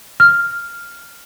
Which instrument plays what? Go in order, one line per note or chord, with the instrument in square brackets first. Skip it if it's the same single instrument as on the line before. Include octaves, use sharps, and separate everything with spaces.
[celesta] F6